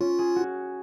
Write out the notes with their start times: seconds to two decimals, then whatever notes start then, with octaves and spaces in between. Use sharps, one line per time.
0.01 C#4 F4
0.19 G#4
0.36 F#4